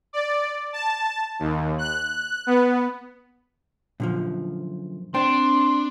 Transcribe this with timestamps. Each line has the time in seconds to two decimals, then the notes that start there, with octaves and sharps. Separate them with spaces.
0.13 D5
0.73 A5
1.40 D#2
1.78 F#6
2.47 B3
4.00 F#2 A#2 D3 F3
5.14 C4 D4 G5 C6